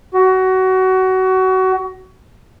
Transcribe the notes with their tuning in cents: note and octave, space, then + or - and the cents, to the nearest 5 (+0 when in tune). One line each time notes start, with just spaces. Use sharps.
F#4 +25